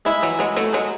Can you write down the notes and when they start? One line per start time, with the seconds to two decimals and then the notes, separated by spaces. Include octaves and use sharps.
0.05 G#3 E4
0.22 E3 F#3
0.39 F#3 G#3
0.56 F#3 A3
0.73 F#3 G#3